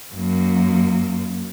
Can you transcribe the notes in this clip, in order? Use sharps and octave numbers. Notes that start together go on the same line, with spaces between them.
F#2 A#3